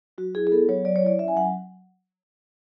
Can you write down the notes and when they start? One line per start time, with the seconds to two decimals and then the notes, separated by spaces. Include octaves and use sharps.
0.18 F#3 F#4
0.35 E4 G#4
0.47 G#4
0.52 B3 A4
0.69 F#3 C#5
0.85 F#3 D5
0.96 C#5
1.03 E4 D5
1.19 C#4 E5
1.28 G#5
1.36 F#3 F#5